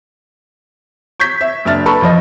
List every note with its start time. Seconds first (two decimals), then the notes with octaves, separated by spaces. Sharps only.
1.20 C#6 G6 G#6 B6
1.41 E5
1.65 F#1 D4 E5 F6 A6
1.86 A4 B4 A5 B5 C#6
2.02 F2 F3 D#5